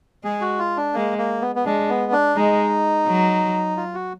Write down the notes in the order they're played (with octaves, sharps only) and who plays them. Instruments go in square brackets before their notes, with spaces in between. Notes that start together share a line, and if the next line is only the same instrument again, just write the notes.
[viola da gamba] G#3 [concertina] G#4
[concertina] F#4
F4
D4
[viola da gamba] G#3 [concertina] A#3
[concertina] A#3
B3
B3
[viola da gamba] G#3 [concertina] D4
[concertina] B3
D4
[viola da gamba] G#3 [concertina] D#4
[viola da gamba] F#3
[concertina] F4
F#4